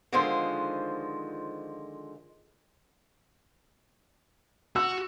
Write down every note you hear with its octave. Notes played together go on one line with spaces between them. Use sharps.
D3 D#3 F3 G#3 F4 C5
F#4 E6